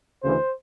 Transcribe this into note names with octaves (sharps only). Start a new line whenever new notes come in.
D2 C#3 E3 C5